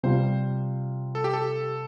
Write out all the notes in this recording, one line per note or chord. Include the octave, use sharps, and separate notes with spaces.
C3 G3 F4 C5
A4
G4
A4